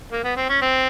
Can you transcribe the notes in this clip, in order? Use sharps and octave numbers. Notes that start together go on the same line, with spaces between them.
A#3
B3
C4
C#4
C4